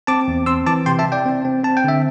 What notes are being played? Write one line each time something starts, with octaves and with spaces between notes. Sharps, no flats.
C4 A5 D6
E2
C4 C6 E6
E3 A5 D6
C3 G5 C6
E5 A5
C3
D5 G5
C4
C4
C4 A5
G5
D3 E5